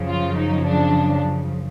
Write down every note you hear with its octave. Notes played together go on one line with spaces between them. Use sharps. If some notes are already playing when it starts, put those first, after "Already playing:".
Already playing: F#2 C#3 F3
F4
D#4
D4